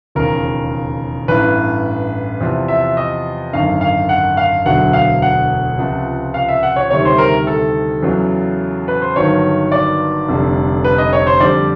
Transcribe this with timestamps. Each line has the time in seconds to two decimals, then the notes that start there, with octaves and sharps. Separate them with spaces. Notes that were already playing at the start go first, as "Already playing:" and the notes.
0.15 E1 D#2 C#3 F3 A#4
1.28 A1 G2 E3 B4
2.41 E2 C3 F3
2.68 E5
2.97 D#5
3.53 G#1 F#2 D3 F5
3.81 F5
4.09 F#5
4.37 F5
4.65 E1 D2 D3 F#3 F#5
4.93 F5
5.22 F#5
5.78 C#2 C3 F3
6.34 F5
6.49 E5
6.63 F#5
6.76 C#5
6.91 D2 C3 D#3 G3 C#5
7.05 C5
7.18 A#4
7.47 A4
8.03 E2 C#3 F#3
8.88 B4
9.02 C5
9.16 G1 G2 D#3 F#3 C#5
9.72 D5
10.29 F1 F2 D3 G3
10.85 B4
10.98 D#5
11.13 C#5
11.27 C5
11.40 F2 D3 G3 D5